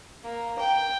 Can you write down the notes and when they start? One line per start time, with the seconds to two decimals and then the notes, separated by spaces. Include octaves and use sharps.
0.24 A#3
0.59 G5